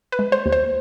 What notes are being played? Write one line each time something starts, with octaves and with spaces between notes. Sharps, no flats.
B4
G#3
C5
D#2
C5